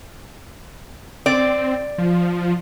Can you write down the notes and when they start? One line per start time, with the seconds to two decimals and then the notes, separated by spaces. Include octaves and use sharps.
1.26 C4 D5
1.98 F3